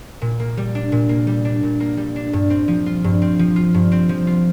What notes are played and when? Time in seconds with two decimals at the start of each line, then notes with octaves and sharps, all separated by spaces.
0.22 A#2
0.40 A#3
0.57 G3
0.75 D4
0.92 A#2
1.09 A#3
1.27 G3
1.45 D4
1.63 A#2
1.80 A#3
1.97 G3
2.16 D4
2.33 G2
2.50 C4
2.68 F3
2.86 F4
3.04 G2
3.22 C4
3.39 F3
3.56 F4
3.74 G2
3.92 C4
4.09 F3
4.27 F4